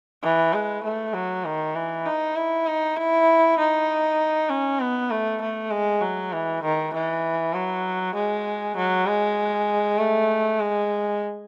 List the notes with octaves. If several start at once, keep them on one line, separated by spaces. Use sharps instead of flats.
E3
G#3
A3
F#3
D#3
E3
D#4
E4
D#4
E4
D#4
C#4
B3
A3
A3
G#3
F#3
E3
D#3
E3
F#3
G#3
F#3
G#3
A3
G#3